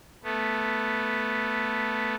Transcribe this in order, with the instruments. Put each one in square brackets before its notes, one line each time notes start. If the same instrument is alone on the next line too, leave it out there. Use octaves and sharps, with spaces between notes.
[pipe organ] A3 B3